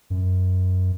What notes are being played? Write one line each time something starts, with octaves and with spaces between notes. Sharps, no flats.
F#2